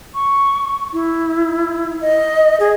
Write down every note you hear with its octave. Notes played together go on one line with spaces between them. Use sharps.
C#6
E4
D#5
G#4